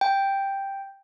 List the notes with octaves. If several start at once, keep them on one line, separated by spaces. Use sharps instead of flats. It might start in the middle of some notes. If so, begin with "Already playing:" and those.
G5